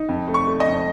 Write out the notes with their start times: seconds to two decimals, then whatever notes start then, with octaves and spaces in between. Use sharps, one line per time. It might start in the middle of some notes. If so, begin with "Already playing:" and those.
Already playing: D#4
0.09 F2
0.28 A3
0.34 C#6
0.47 A3
0.60 D#5
0.66 F2